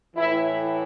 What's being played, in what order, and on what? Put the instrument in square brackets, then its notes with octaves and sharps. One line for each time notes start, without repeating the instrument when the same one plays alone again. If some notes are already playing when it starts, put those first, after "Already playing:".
[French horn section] A2 E3 E4